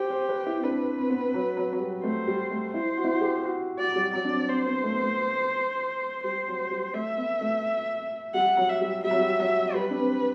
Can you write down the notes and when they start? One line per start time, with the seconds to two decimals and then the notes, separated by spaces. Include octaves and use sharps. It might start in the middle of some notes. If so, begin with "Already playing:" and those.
Already playing: G4 C5
0.10 C5
0.29 B4
0.46 E4
0.59 C4
0.63 D4 B4
0.98 C4
1.10 B3
1.21 C4
1.34 F#3
1.57 F#3
1.73 F#3
1.80 G3
2.04 A3 C5
2.28 G3
2.51 A3
2.74 E4 C5
2.97 F#4
3.04 E4
3.13 F#4
3.21 G4
3.44 F#4
3.79 F#4 D5
3.92 F#3
3.96 G3
4.13 F#3 D5
4.25 D4
4.31 C4
4.49 C4 C5
4.66 B3
4.83 A3
4.93 B3
5.03 A3
6.24 G3 C5
6.48 F#3
6.71 G3
6.93 A3 E5
7.17 B3
7.41 A3
8.34 G3 F#5
8.57 F#3
8.69 E5
8.81 G3
9.04 G3 E5
9.11 F#3
9.19 G3
9.40 F#3
9.74 G3 B4
9.90 D4
9.98 C4